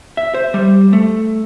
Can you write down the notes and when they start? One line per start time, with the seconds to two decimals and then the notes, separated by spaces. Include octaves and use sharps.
0.17 E5
0.34 C5
0.54 G3
0.93 A3